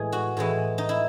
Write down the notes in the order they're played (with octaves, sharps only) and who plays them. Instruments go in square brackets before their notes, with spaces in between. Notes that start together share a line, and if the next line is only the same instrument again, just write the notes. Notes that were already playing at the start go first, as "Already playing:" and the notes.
Already playing: [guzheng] A2 E3 G#3 G#4
F#4
A2 E3 G#3 E4
D#4
E4